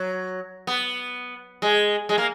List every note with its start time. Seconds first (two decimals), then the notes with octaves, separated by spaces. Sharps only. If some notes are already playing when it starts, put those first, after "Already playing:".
Already playing: F#3
0.67 B3
1.62 G#3
2.09 G#3
2.18 A#3